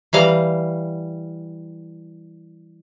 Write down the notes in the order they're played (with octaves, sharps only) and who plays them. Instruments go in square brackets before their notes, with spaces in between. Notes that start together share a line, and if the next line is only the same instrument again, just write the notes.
[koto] E3 G3 F5 A#5